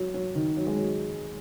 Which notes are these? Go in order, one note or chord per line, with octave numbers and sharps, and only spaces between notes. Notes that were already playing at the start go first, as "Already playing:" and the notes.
Already playing: F#3
F#3
D#3
F#3
G#3
F#3